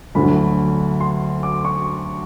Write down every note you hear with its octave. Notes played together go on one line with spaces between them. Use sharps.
D2 D3 F#3 B5
C6
D6
C#6